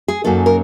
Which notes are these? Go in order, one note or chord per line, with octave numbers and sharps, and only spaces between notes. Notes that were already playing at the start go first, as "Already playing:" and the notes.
G#4
F#2 C#3 F#3 A#3 D#4 A4
A#4